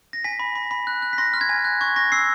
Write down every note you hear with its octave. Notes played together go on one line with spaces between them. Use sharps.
A#6
G#5 B6
B5
B5
B5
F#6
F#6
B6
C6 A#6
F6
G#6
G#5
F#6
C#6 G#6
C#6 A#6
E6 C7